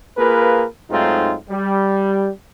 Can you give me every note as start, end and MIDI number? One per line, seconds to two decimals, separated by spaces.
0.17 0.64 58
0.17 0.64 65
0.17 0.64 68
0.17 0.64 70
0.17 0.64 71
0.90 1.34 44
0.90 1.34 54
0.90 1.34 57
0.90 1.34 60
0.90 1.34 63
0.90 1.34 65
1.49 2.29 55